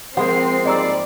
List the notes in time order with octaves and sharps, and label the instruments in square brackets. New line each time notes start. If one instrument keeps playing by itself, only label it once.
[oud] F3 G#3 A#3 [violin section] C4 C7 [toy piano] G4 F#5 B5
[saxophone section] G#2 G3 D5 [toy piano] D#5 A#5 E6